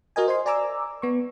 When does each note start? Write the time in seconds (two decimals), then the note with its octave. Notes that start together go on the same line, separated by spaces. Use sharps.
0.16 F#4 A#4 D#5 G#5
0.28 C5 D#5 G#5 C6
0.46 D5 G#5 A#5 D6 E6
1.02 B3 C#6